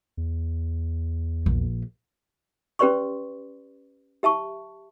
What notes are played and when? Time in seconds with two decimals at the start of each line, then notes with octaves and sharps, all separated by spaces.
0.17 E2
1.46 A#1
2.79 C#4 G4 B4 D5 C6 C#6
4.23 G4 E5 A5 C#6